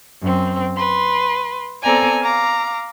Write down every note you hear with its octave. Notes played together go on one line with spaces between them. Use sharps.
F#2 C4
B4 C6
B3 C4 A4 D5 G#5 A#5
F5 A#5 D6